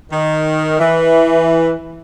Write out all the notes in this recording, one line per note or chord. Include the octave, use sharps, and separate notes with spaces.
D#3
E3